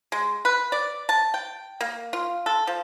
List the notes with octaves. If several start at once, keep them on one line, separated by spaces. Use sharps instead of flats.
G#3
B4
D5
A5
G5
A#3
F4
A4
F3